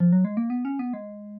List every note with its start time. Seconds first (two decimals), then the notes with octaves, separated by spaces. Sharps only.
0.00 F3
0.12 F#3
0.25 G#3
0.37 A#3
0.50 B3
0.65 C#4
0.79 B3
0.94 G#3